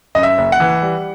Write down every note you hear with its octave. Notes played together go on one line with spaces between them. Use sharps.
F#2 D#5
E5
F#1
F#5
E3
G3